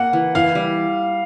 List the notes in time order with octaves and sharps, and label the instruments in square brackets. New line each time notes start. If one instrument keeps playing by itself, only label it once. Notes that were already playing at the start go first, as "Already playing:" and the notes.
Already playing: [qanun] A#3 [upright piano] F#5
[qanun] E3
[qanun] E3 [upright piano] F5
[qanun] G3